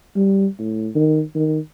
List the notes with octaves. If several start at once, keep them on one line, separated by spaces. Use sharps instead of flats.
G3
A2
D#3
D#3